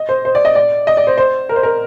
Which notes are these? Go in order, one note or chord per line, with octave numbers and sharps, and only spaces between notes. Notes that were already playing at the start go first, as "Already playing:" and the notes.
Already playing: D#5
C5
C5
D5
D#5
D5
D#5
D5
C5
C5
A#4
C5
A#4